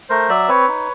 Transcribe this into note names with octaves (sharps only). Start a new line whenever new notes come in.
A3 A#4 C5
F#3 D5 E5
C4 B4 C#5
D#4